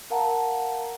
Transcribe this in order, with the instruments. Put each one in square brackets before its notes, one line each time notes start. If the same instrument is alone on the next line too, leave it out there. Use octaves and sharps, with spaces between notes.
[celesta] A#4 F5 F#5 A5 A#5